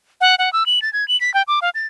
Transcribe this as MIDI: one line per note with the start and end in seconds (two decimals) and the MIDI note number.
0.21 0.35 78
0.39 0.52 78
0.53 0.66 88
0.66 0.82 102
0.82 0.92 93
0.93 1.07 92
1.08 1.19 102
1.21 1.33 95
1.34 1.43 79
1.48 1.60 86
1.62 1.70 77
1.75 1.87 93